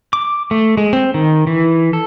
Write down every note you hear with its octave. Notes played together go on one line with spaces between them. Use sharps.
D6
A3
G#3
C4
D#3
E3
A4